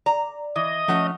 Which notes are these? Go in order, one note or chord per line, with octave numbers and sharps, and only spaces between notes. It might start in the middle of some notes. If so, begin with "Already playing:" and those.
D5 A#5
E3 D#5
F3 A3 C#4 F#5